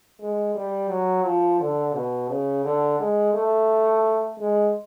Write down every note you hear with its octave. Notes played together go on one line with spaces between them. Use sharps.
G#3
G3
F#3
F3
D3
B2
C#3
D3
G#3
A3
G#3